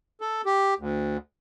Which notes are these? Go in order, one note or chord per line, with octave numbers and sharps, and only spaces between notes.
A4
G4
D2